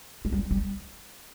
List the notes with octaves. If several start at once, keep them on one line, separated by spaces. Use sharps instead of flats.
G#3
G3
G3